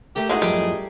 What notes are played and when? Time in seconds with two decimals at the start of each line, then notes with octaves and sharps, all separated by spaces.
0.16 A3 G4 A#4
0.29 A2 G#3 D#4 F#4 G#4 D#5
0.42 F#2 E3 F3 G3 D6